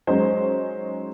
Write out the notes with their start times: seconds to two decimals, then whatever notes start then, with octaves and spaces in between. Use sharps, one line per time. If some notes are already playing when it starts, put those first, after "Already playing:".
0.07 F#3 G#3 C#4 D#4 C5